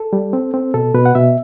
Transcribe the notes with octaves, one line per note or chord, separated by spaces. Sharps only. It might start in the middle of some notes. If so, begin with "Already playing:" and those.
Already playing: A4
G3
C4
C4
B2 A4
B2 B4
F#5
B2 E5